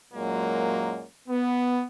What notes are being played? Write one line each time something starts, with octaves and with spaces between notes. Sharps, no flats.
F#2 A#2 F#3 G#3 A#3
B3